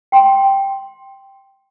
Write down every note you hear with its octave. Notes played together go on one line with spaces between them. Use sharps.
G5 C6